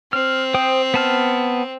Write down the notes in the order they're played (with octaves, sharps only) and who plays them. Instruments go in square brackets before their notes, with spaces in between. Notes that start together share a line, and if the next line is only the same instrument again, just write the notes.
[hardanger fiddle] C4 [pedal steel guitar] F6
[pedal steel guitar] C5 G5 D#6
B3 A5 F6